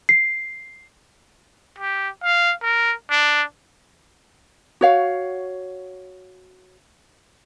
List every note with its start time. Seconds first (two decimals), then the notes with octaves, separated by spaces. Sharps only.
0.09 C7
1.78 G4
2.24 F5
2.63 A#4
3.11 D4
4.81 F#4 C#5 F5